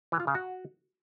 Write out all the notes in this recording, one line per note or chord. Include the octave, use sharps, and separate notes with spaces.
E3
F4
C#3
F#4